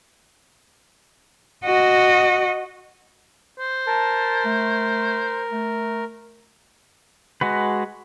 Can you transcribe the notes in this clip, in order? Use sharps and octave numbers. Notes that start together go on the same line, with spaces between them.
F#4 D#5
C5
A#4 A5
A3
A3
G#3 F#4 B4